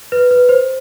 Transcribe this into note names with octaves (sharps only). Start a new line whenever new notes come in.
B4
B4
C5